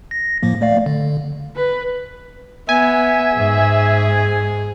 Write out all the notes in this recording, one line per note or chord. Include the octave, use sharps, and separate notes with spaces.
A#6
A2 F3 A#3
A3 D5 F5
D3
B4
B3 E5 G#5
G#2 G#4